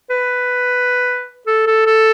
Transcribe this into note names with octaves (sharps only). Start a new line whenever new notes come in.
B4
A4
A4
A4